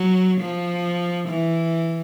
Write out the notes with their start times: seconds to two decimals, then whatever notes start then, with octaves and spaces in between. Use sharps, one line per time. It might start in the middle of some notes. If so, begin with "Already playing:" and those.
Already playing: F#3
0.41 F3
1.28 E3